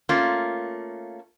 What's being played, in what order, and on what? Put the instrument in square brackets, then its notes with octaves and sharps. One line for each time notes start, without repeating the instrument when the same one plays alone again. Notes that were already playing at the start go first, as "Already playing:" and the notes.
[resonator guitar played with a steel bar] A3 A#3 C#4 F4